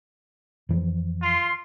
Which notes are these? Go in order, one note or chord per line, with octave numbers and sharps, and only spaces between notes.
F2 E3 F3
F4 C6